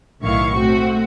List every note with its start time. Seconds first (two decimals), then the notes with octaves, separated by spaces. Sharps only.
0.21 B1 A2 D#3 E4 F5 C#6
0.57 A3 C4 F#4